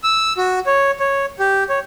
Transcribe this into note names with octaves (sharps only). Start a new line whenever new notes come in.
E6
F#4
C#5
C#5
G4
C#5